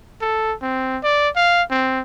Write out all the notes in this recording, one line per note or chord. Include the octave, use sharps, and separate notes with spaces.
A4
C4
D5
F5
C4